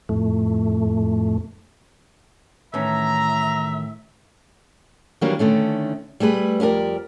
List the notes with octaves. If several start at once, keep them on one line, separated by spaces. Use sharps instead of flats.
F2 A2 A3
A2 D#3 E3 C#4 E5 A#5
D#3 E3 F#3 G3 A#3 D4
D3 D#3 A3 C#4
G3 A3 G#4 B4
F2 C#4 G4 A#4 D5